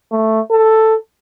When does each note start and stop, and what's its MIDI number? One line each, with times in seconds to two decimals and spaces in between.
0.12 0.41 57
0.51 0.96 69